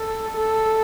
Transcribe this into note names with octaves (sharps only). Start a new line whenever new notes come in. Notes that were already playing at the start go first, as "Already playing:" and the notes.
Already playing: A4
A4